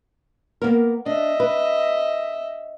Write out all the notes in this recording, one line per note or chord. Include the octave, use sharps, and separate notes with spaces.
A#3 B3 A#4
D4 D#5 E5
B4